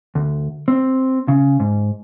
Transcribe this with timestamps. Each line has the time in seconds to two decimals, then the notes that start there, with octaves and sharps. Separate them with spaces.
0.15 D2
0.68 C4
1.28 C#3
1.60 G#2